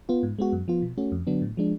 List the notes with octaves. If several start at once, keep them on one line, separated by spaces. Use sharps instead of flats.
B3 F4
G#2
G#3 B3 F#4
F#2
F3 B3 F4
B2
A3 C#4 F#4
F2
D3 F#3 B3 D4
A2
F3 G#3 D4